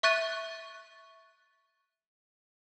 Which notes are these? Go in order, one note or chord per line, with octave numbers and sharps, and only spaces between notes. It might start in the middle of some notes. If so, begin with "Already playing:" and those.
E5 C#6 F#6 A6 D#7